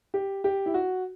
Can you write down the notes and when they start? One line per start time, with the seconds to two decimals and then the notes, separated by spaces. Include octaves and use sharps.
0.14 G4
0.44 G4
0.66 E4
0.74 F#4